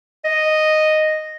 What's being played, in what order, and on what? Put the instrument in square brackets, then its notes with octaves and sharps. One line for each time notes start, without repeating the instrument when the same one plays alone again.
[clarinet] D#5